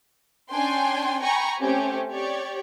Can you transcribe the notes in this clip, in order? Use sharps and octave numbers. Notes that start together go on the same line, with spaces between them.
C#4 D4 G5 G#5 C6
G5 G#5 A#5 B5 C#6
A3 C4 C#4 G4
G4 C#5 D5